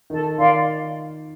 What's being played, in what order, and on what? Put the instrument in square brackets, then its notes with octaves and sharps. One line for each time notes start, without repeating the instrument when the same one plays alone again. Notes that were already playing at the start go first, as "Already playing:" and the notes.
[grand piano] D#3 [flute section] A4
[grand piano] D#3 [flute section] D5 F5 C6